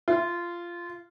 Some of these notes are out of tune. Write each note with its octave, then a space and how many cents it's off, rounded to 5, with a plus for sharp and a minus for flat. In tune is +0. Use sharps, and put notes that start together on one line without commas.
F4 -15